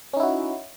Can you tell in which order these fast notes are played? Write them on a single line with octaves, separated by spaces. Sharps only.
C#4 D#4 E4 F#4